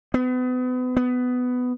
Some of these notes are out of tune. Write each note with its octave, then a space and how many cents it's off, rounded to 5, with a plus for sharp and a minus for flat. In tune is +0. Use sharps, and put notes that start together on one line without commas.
B3 +35
B3 +15